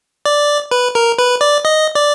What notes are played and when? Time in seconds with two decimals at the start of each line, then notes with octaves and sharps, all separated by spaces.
0.26 D5
0.71 B4
0.95 A#4
1.19 B4
1.41 D5
1.65 D#5
1.95 D5